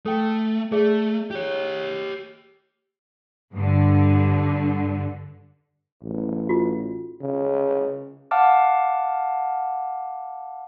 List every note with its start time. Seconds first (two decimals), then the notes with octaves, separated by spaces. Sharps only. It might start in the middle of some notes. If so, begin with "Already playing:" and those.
0.06 A3 A4 G5
0.72 A3 G#4 D5 E5
1.31 G4 C#5
3.54 G2 D3
6.03 A1
6.49 D#4 F4 F#4
7.21 C#3
8.31 F5 F#5 A5 D6 F6